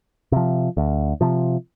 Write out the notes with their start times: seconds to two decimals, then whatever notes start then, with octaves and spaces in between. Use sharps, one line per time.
0.32 C3 F3
0.77 D2
1.21 C3 F3